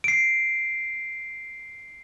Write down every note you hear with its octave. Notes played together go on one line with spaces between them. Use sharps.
C7 D7